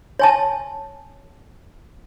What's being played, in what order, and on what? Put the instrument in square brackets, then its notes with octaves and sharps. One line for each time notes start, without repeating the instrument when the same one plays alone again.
[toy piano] C#5 G#5 A5